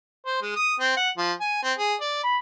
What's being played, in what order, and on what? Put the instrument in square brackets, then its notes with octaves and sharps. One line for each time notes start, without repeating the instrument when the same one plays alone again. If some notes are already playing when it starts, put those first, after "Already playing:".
[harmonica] C5
G#3
D#6
C4
F#5
F3
G#5
C4
G#4
D5
B5